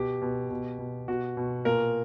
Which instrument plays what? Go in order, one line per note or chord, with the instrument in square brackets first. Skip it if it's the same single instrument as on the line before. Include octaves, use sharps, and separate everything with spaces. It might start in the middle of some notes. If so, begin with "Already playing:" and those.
Already playing: [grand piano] B2 G4
B2
B2
B2
B2 F#4
B2
A#2 A#4